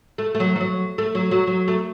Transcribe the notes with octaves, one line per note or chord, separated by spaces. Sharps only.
A3
A3
F#3
E3
F#3
A3
F#3
F#3
F#3
A3